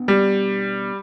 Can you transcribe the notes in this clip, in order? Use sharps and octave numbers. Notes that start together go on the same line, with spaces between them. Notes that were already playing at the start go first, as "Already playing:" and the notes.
Already playing: B2 B3 D4
G3